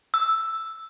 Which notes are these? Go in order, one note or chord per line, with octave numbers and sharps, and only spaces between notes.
E6